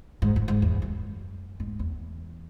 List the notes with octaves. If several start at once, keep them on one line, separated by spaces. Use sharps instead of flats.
G#2
G#2
G#2
E2
F#2
G#2
E2